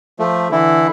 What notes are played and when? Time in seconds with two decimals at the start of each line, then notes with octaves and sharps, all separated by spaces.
0.19 F3 A3
0.52 D3 E3 E4